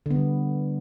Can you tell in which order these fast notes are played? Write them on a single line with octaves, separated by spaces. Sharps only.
D3 B3 G3